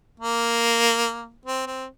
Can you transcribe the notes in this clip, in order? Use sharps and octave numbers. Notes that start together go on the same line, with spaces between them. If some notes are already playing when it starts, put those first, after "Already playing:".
A#3
C4
C4